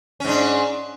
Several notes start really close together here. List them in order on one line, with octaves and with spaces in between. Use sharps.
C#4 G#2 D4